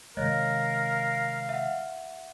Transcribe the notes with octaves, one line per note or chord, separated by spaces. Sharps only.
C3 D#3 G#3 A#4 C#5 D#5 F5 F#6
E5 F#5